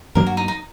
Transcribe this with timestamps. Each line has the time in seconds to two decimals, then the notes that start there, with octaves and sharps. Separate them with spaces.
0.15 G2 F#3 A#3 D4 A#4
0.26 F#4
0.37 D#4
0.48 D#4